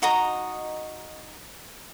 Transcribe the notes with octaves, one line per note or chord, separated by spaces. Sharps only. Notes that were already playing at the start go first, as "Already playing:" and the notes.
D#4 F#4 D#5 A#5